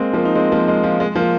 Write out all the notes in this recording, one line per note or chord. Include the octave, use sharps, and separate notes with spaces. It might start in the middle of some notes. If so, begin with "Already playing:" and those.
Already playing: G#3 A#3 C4
F3 A#3
D#4
G#3 C4
F3 A#3
G#3
F3
G#3
F3 A#3